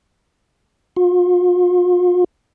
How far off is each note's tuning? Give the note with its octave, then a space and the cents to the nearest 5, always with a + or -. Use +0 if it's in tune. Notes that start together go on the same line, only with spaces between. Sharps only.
F4 +40